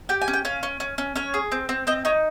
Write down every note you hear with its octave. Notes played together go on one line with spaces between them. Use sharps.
G4 G5
G#5
C#4
G5
C#4 F5
C#4
C#4
C#4
C#4 C#5
G#4
C4
C4
C4 D#5
D#4 C#5